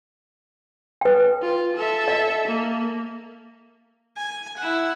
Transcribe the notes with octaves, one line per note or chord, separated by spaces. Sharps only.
B4 G5
F4
A4 E5
D#5
A#3
G#5
E4 F#5